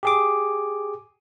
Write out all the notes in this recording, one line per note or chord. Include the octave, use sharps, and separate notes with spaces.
G4 G#4 D6